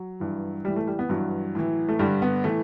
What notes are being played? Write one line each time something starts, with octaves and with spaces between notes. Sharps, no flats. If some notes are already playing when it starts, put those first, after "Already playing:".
Already playing: F#3
G2 E3
A2 E3 G3
A3
G3
B3
G2 E3 F#3
A2 E3
A3
G2 D3 G3
B3
A2 E3 A3